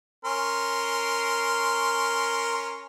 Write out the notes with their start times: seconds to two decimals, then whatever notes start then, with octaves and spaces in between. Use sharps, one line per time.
0.25 C#4 A#4 C6